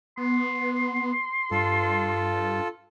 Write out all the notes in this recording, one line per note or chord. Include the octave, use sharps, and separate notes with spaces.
B3 C6
G2 F4 A4